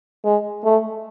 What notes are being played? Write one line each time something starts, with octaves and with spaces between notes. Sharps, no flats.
G#3
A3